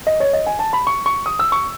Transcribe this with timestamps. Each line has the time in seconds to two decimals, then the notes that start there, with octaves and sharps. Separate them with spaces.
0.07 D#5
0.20 C#5
0.33 D#5
0.46 G#5
0.59 A5
0.73 B5
0.87 C#6
1.06 C#6
1.26 D#6
1.39 E6
1.52 C#6